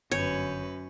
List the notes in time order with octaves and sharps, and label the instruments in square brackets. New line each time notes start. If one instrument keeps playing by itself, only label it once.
[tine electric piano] G1 G#5 G6 [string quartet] F#2 B4 [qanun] C#5